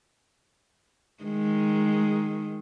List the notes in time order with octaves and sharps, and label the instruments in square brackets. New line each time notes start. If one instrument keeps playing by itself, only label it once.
[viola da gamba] D#3 G#3